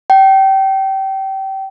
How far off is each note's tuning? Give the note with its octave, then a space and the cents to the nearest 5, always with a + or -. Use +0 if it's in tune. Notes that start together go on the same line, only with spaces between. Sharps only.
G5 -25